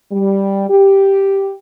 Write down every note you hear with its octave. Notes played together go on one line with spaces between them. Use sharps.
G3
G4